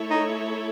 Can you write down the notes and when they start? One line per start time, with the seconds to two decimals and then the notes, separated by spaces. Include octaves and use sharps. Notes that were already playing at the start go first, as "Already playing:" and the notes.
Already playing: A3 E4 A4 C#5
0.10 D#4